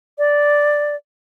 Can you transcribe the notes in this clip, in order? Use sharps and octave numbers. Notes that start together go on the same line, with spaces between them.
D5